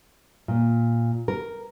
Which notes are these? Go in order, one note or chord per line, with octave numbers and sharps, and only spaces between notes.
A#2
A#4